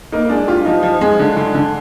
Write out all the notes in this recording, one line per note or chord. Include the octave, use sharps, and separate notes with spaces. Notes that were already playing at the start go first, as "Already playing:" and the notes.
A#3 D#4
G#3 D4
F4 G4
F3 D#4
F3
G#3
D3
D3
D3